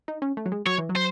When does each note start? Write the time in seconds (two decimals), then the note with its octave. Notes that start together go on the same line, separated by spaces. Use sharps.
0.08 D#4
0.22 C#4
0.37 A3
0.46 F#3
0.52 G#3
0.66 F#3 C#5
0.78 E3
0.89 F#3
0.95 C5